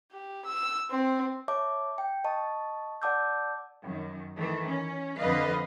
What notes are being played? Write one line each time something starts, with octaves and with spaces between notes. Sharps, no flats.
G4
E6
C4
C#5 E5 A5 D6
G5
D#5 A5 C#6
D5 F#5 A5 D6 E6 G6
F#2 D#3
D#3 E3 A3
C#4
F2 D3 B4 D#5 F5